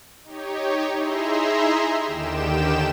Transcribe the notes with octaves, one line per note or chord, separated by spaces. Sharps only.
D#4 G4 C#5
D#4 E4 G#4 E5 A#5 C6
D#2 D3 D#3 G4 G5 E7